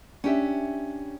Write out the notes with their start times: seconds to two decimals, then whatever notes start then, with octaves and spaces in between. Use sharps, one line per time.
0.24 C#4 D4 G4 E5